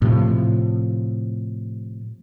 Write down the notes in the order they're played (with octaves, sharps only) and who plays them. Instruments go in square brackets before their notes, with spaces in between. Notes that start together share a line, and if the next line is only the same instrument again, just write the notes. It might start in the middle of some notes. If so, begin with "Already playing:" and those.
[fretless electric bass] A2 C3 F3